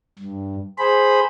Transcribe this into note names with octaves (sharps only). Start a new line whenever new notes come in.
G2
G#4 C5 B5